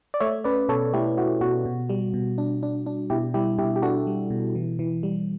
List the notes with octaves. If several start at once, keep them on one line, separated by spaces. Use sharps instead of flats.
D5
A3 C#5 E5
C#4 B4 D5
B2 A4 C#5
A3 E4 G4
E4 F#4
B2 F#4
B2
G3
B2
D4
D4
D4
B2 E4 G4
G3 E4 G4
B2 E4 G4
G4
D4 F#4 A4
G3
B2
E3
E3
G3